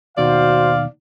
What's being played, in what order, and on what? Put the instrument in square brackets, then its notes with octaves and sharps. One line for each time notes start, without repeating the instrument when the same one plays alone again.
[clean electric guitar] D#2 B2 D#3 [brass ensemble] F#4 C5 [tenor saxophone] D5 [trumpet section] F5